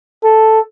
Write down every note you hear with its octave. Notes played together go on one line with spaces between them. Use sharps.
A4